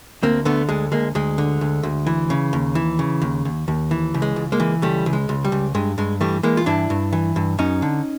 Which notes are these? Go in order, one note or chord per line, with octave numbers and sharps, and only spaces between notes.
D2 A#3 C4
D3 A3 B3
D2 G#3
D2 G#3 A#3
D2 G#3
D3
D2
D2
E3
C#3
D#2
E3
C#3
D#2
D#2
D#2
E3
C#2
G#3
C#2
G#3 A#3
E3
C#2 G3 A3
C#2
G#3
C#2
G3
C#2
G2 G#3
G2 G#3
E3 G3 A3
E3 G#3 A#3
F4
G2 D4 E4
G2
E3
G2
F#2 C#4 D#4
D3